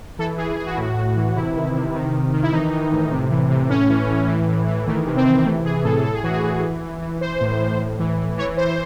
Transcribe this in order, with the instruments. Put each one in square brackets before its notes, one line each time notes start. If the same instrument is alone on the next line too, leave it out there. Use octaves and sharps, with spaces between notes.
[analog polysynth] E3 A4
E3 G#4
E3 G#4
F#4
E4
A2 F#4
A2
E3
C3 E4
D#3
C3
D#3
C3
D#3
E4
E3 D#4
E3
A2
C3
E3
C3
A2 C#4
E3
A2
E3
A2
E3
D#3 A3
C3
C4
C3
E3 A3
E3 G#4
A2 A4
A2 A4
G#4
E3 F#4
G#4
E3
E3
E3
E3
E3 C5
A2
A2
A2
E3
E3
E3 C#5
E3 C5